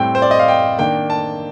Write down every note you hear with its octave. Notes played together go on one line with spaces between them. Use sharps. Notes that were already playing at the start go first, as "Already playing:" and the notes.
Already playing: A2 G3 C4 G5
C5
D5
D#5
F5
G5
D#3 A#3 D4 G5
A5